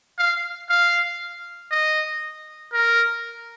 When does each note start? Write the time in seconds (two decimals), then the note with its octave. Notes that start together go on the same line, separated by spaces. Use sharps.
0.19 F5
0.69 F5
1.71 D#5
2.73 A#4